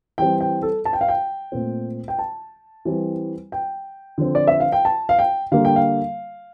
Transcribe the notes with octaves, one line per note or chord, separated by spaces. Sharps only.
E3 G3 C4 G5
G5
A4
A5
G5
F5
G5
A#2 A3 C4
G5
A5
E3 G3 C4
G5
D3 F3 C4
D5
E5
F5
G5
A5
F5
G5
D3 G3 A#3 F5
G5
F5